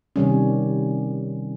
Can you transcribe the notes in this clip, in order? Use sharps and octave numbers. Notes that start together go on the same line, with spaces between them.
C3 D#3 G3 C#4